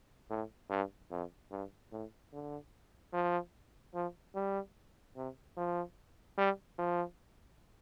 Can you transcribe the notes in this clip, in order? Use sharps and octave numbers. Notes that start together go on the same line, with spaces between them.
A2
G2
F2
G2
A2
D3
F3
F3
G3
C3
F3
G3
F3